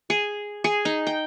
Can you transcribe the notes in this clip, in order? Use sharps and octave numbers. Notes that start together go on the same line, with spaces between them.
G#4
G#4
D#4
G5